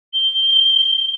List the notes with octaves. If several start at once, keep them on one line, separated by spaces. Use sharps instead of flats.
G7